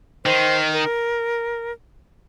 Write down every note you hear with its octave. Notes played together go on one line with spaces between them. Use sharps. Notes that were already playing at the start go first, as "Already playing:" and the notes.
D#3 C5
A#4